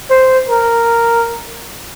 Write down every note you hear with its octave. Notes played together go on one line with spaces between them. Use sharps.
C5
A#4